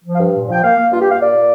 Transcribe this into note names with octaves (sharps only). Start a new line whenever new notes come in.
F3
F5
G2
A#2
F3 G5
A#3 F5
A#3
G2 F4
G4
A#3 F5
A#2 D5
A#2